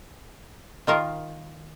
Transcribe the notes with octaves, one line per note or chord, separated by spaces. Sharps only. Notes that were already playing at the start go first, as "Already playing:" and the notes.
D#3 F4 A#4 D#5